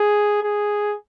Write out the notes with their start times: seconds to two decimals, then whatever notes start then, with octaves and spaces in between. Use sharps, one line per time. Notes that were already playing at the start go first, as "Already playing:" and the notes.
Already playing: G#4
0.43 G#4